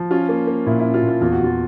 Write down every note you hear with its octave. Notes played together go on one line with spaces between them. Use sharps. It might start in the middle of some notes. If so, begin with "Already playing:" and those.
Already playing: F3
C#4 F4
A#3
A#3
A#2 E4
E4
C#4
F4
A#2
F4
E2 F4
F#4
E2 F4